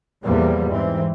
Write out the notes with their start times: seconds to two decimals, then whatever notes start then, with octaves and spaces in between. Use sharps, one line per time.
0.24 E2 A#2 F3 G3 A#3
0.68 G#2 E3 C4